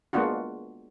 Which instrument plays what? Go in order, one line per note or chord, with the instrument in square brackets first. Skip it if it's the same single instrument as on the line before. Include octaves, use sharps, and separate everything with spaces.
[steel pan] G#3 A#3 B3 D4 F4 F#4